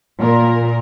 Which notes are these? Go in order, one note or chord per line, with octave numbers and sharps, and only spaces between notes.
A#2 A#4